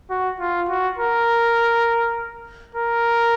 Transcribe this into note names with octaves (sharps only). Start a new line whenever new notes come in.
F#4
F4
F#4
A#4
A#4